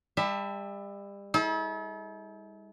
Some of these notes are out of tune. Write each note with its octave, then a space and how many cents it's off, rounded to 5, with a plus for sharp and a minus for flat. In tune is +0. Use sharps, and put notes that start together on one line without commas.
G3 +35 E5 +0 A5 +30
E4 -45 A4 -40